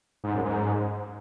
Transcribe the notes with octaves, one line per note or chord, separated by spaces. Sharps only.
G#2
F#2
G#2